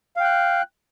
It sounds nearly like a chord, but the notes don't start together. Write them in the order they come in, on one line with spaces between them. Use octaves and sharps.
F5 G5 F#6